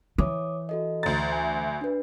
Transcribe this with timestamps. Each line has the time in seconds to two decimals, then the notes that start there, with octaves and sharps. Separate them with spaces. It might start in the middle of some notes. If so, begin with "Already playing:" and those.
0.18 E3 C#5 D6 D#6
0.69 F#4 A4 D#5
1.03 D2 A#5 A6
1.29 E5 G#5
1.81 D4 B4